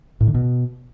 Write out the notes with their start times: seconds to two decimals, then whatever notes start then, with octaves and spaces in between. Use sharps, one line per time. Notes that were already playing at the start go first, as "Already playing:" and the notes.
0.20 A2
0.27 D3
0.34 B2